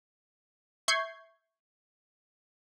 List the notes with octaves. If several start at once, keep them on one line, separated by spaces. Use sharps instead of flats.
E5 C#6 G6 G#6 C7